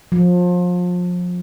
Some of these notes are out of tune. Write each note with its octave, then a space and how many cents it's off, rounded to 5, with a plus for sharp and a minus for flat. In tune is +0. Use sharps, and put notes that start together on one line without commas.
F3 +30